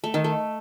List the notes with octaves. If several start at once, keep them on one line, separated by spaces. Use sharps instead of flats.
A3
D#3
A3